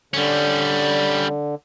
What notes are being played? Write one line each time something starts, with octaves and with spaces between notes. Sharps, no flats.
D3 G3 C#4